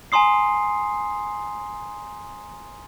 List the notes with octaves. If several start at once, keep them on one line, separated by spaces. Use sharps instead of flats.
G#5 A#5 C6 D#6 C7